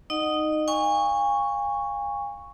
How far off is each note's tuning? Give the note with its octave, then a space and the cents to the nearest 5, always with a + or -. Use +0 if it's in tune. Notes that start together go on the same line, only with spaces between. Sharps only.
D#4 +0 D#5 -30 F#5 +0
F5 +25 G#5 -35 C#6 +0